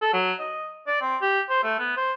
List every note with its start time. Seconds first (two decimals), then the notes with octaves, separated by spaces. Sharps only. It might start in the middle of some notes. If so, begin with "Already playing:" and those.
0.02 A4
0.13 F#3
0.40 D#5
0.87 D5
1.01 C4
1.22 G4
1.50 C5
1.64 A3
1.79 B3
1.97 C5